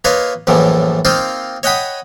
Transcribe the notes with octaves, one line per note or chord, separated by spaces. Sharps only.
A#3 F4 B4 C#5 D#5
A#1 F#2 A2 E3 F3
A#3 C4 D#4 F4 G5
C#5 D#5 F#5 G5 B5 D#6